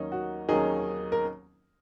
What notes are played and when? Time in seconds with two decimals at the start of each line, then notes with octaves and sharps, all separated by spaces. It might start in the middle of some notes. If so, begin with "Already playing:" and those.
Already playing: D#2 D#3 F#3 A#3 C#4 D#4
0.12 F#4
0.49 D#2 D#3 F#3 A#3 C#4 D#4 G#4
1.12 A#4